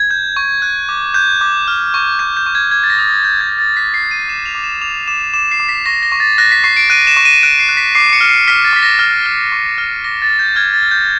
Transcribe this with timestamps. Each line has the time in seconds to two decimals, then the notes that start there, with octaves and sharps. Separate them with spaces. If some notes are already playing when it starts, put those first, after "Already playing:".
Already playing: G#6
0.11 G6
0.37 C#6
0.62 F#6
0.89 D6
1.14 F#6 G6
1.41 D6
1.68 F6
1.94 C#6
2.19 C#6 G6
2.37 G6
2.46 C#6
2.55 G#6
2.71 G6 G#6
2.84 A6
2.90 A#6
2.99 D#6
3.07 A6
3.24 G6
3.41 G#6
3.50 G6
3.58 A6
3.77 F#6 B6
3.94 C7
4.03 F#6
4.11 D#7
4.28 D6 E7
4.46 F7
4.55 D6
4.64 E7
4.81 D6 F7
5.08 D6 E7
5.34 D6 E7
5.51 C7
5.60 D6
5.69 B6
5.86 C#6 A#6
6.03 A#6
6.12 C#6
6.20 A6
6.38 F#6 A#6
6.52 B6
6.64 C#6 C7
6.77 D7
6.90 F#6 D#7
7.07 E7
7.17 C#6
7.25 D#7
7.42 F#6 D7
7.59 C7
7.69 F#6
7.77 B6
7.95 D6 C7
8.13 C#7
8.21 F6
8.29 C7
8.48 F6 B6
8.64 A6
8.73 D6 B6
8.83 A#6
8.99 F6
9.26 F6
9.52 C#6
9.78 F6
10.04 D6 A#6
10.22 A6
10.30 F6
10.39 G6
10.56 F6 G#6
10.73 A6
10.83 F6
10.91 G6